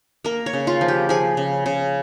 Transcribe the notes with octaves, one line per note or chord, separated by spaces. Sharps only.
A#3 A#4
C#5
C#3
F4
F3
G4
F3 G#4
C#3
C#3